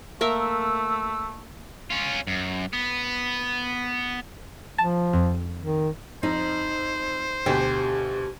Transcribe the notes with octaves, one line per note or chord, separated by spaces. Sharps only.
A3 A#3 A#4 E5 E6
C#4 F4
F#2
B3
F3 A5
F2
D#3
F2 D#4 C5
D2 B2 G4 G5